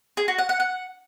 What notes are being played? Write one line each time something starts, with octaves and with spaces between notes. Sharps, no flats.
G#4
F#4
F#5
F#5
F#5